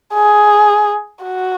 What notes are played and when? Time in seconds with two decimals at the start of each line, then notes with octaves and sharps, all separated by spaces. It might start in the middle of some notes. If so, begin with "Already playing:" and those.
0.14 G#4
1.23 F#4